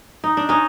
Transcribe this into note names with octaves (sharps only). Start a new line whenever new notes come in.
D#4
D4
C#4 D#4